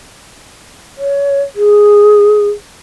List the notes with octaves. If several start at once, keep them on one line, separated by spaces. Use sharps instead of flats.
C#5
G#4